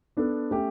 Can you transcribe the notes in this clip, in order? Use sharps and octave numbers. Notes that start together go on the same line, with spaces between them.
B3 D4 A4
A3 C#4 G4